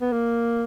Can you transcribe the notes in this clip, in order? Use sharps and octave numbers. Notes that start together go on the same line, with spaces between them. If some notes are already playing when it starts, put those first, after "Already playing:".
B3
A#3